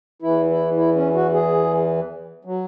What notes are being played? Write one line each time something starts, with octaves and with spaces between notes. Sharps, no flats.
E2 E3 E4
E4
E4
C#4
F#4
G#4
F#3